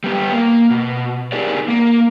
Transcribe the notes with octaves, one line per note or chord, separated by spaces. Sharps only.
G3 B3 G4
A#3
B2
D#4 G4 G#4 A#4 D5
A#3 A#4